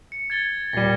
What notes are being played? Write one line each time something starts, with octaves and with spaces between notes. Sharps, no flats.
C#7
G#6 A6 G7
D#1 G3 A#6 C7 D#7